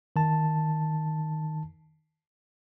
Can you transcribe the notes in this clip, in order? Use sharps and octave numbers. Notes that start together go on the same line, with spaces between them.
D#3 A5